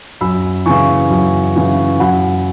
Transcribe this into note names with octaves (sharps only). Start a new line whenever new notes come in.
F#2 B5 E6
C#3 E3 G#5 C#6
F#2
C#3 E3
F#2 F#5 B5